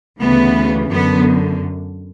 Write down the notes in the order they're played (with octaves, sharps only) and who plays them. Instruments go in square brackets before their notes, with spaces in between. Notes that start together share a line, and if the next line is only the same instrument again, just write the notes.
[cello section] D2 C#3 E3 B3
F#2 D3 B3